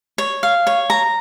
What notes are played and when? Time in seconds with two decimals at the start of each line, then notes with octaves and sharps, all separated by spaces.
0.18 C#5
0.43 F5
0.67 C#5
0.90 A#5